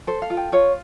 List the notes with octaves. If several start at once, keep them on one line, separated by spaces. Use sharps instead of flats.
A4 C5
F5
F4
G5
F4 C#5